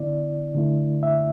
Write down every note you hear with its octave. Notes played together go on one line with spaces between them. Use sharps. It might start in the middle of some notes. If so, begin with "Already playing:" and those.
Already playing: D3 B3 E4 D5
D3 A3 E4
E5